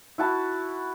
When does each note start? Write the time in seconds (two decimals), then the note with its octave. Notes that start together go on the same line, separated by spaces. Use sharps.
0.18 E4 F#4 A5